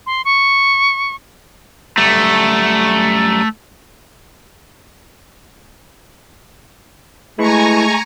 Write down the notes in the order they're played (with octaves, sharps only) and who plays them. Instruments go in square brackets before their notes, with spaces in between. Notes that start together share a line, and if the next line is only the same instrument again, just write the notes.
[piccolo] C6
C#6
[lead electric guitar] F#2 G3 [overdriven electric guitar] A3
[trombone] G#3 [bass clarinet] A3 [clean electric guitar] E4 B4 B5 [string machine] G#5 A#5 C#6